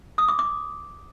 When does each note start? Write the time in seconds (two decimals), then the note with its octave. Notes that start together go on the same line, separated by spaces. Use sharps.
0.18 D#6
0.28 D6
0.39 D6